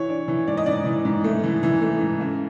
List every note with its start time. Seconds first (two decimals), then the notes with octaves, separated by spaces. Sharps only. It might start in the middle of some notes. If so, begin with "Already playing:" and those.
Already playing: E3 C#5
0.09 D4
0.28 E3
0.47 G#2 D5
0.57 D#5
0.66 G#2 D5
0.86 E3
1.05 G#2
1.24 A3
1.44 E3
1.63 E3
1.82 A3
2.01 G#2
2.20 C#3